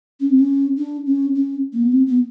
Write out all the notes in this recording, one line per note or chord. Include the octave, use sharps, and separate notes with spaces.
C#4
C4
C#4
D4
C#4
C#4
A#3
B3
C4
B3